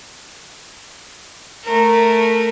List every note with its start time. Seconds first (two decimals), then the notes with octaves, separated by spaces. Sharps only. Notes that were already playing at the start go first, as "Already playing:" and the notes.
1.65 A3 A#4